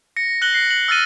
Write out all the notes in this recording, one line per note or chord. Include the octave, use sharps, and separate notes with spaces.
A#6 C#7
F#6 A#6 F#7 G7
C7
F#7
E6 F6 A6 D#7